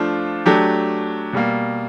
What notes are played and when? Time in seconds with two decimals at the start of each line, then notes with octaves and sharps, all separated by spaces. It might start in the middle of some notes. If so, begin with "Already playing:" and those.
Already playing: F3 A3 D4 F4
0.46 F#3 A3 D4 G4
1.33 B2 G3 A#3